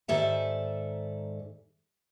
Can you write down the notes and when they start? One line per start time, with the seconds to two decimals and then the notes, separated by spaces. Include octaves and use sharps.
0.08 G#2 D#3 A4 D5 E5 G#5